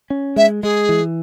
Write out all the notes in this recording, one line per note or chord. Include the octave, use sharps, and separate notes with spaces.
C#4
G#3 E5
G#3 G#4
E3